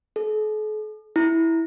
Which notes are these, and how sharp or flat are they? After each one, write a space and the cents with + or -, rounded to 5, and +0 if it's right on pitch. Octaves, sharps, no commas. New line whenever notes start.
A4 -45
E4 -5